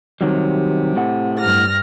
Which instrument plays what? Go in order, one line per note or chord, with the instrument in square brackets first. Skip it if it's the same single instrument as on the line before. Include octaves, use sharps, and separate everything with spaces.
[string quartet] C3 [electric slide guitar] D#3 F#3 G3
[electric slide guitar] A2 F#5
[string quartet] G2 F6 A#6